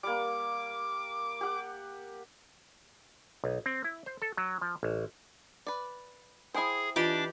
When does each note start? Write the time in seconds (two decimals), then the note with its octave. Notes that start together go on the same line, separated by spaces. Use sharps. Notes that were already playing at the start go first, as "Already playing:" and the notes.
0.03 G3 A#3 D6
1.41 G4 F#5
3.44 B1
3.66 C4
3.84 E4
4.06 C5
4.22 A4
4.37 F#3
4.61 F3
4.83 A1
5.67 B4 D5
6.55 E4 G#4 C5 G5 G#5 D#6
6.96 E3 D4 F4 G4 D5 D#5 B5 D6